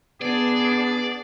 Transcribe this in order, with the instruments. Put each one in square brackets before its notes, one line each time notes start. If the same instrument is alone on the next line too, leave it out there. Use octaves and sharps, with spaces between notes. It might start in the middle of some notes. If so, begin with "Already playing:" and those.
[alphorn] B3 [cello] D4 G#4 [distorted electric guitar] D5